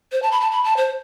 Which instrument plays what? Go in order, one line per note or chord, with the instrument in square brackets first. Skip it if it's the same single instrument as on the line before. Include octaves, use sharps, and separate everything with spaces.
[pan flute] C5
A5
B5
A5
B5
A5
C5